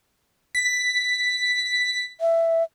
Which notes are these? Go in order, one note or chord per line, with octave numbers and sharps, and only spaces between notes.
B6
E5